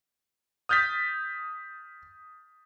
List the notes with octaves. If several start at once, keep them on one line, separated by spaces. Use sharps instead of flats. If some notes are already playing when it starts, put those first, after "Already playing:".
D#6 F6 G6 A6 B6